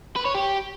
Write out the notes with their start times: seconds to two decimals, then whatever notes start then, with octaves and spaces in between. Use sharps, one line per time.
0.16 B4
0.26 C#5
0.35 G4